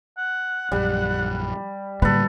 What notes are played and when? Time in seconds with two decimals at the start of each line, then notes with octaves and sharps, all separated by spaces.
0.18 F#5
0.72 A#1 F#2 G3
2.02 A2 D3 G3 A#3 A4 B4